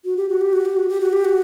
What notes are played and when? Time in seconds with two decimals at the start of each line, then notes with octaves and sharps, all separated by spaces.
0.05 F#4
0.17 G4
0.29 F#4
0.41 G4
0.53 F#4
0.65 G4
0.77 F#4
0.89 G4
1.01 F#4
1.13 G4
1.25 F#4